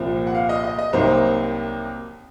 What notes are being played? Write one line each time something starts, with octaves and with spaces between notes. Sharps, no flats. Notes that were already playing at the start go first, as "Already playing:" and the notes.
Already playing: C2 A#2 F3 C4
F#5
F5
D#5
D#5
D#5
C2 C3 F#3 A#3 D#4 C5